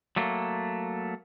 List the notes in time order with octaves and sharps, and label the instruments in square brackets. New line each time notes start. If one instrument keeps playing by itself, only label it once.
[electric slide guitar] F#3 A3 A#3